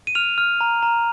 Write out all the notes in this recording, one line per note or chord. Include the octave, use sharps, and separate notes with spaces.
D#7
F6 F7
F6
A#5
A#5